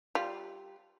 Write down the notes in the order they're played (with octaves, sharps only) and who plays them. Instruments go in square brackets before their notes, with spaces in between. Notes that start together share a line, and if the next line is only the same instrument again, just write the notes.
[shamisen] G3 F4